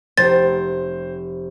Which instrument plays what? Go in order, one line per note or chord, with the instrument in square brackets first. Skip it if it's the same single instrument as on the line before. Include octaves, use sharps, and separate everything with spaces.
[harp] F1 C4 G4 [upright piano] C5 [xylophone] A6